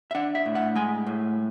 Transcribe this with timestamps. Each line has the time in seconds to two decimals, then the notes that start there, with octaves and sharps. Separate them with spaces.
0.11 E5
0.15 D4 F#5
0.35 E5
0.46 A2
0.55 F#5
0.76 G#3 G#5
1.06 A2